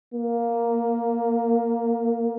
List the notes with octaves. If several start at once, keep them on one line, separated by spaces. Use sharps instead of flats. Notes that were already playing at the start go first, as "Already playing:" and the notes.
A#3